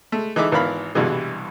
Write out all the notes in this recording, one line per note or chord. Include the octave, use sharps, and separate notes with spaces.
G#3 A3
E3 G#3 D#4 A4 E5 D6
G#1 E3 B3 A#4 F5 B5
C2 G2 B2 E3 G#3